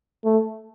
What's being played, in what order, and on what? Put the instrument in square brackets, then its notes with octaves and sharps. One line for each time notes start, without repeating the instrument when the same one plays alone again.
[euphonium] A3